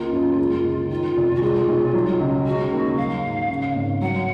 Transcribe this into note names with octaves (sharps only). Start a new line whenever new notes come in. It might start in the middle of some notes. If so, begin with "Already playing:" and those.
Already playing: C#2 A#3 F4
F#2
G#3
C#2
D#3 F4
F1
F#4
G#3 F4
B1
F#3
C#2
G#3 F#4
D#2
F#3 F5
G#2
C#3
G#1
F#3 F#5